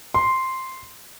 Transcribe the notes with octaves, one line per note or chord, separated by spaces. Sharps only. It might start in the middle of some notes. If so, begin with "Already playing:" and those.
C6